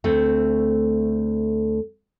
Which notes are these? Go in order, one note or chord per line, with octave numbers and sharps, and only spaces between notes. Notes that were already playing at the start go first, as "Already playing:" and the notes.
D2 A3 C4